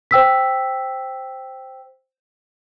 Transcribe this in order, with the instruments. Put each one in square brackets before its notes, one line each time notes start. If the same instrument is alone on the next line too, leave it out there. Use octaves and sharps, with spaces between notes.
[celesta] C5 G5 E6 B6